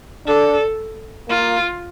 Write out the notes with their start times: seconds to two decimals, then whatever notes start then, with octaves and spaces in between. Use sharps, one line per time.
0.26 D4 A4
1.28 A#3 F4